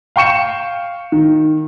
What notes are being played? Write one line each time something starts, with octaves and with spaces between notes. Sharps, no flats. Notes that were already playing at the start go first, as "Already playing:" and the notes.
F5 G5 C#6 C#7 E7
D#3